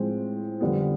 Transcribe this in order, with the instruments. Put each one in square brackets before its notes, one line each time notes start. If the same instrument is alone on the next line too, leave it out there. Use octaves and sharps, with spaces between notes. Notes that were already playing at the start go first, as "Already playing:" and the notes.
Already playing: [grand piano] A2 F3 G#3 C4
F2 D3 G3 B3